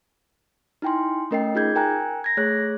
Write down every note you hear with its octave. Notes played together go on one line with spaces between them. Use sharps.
D#4 E4 G5 G#5 C6
A3 C#4 A#4 D#5 G5 C7
D#4 F4 G#4 G6 G#6
A#4 G5 G#5 A#5 F#6
G#6 A#6
A3 G#4 C#5 F#6